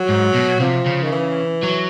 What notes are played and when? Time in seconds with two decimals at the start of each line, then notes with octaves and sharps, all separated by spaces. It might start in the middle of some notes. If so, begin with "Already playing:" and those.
Already playing: F#3
0.10 G#2
0.35 B2
0.60 C3 F3
0.86 C#3
1.04 D#3
1.12 E3
1.63 F#3